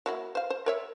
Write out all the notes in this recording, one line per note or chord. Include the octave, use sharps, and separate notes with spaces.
F#3 A#3 E4
C5 F5
C5
A#4 C#5 E5